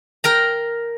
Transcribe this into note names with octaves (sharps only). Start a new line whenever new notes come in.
A#4 G5 A#5